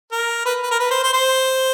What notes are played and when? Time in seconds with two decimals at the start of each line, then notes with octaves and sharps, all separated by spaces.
0.12 A#4
0.46 B4
0.63 B4
0.71 A#4
0.80 B4
0.91 C5
1.03 C5
1.13 C5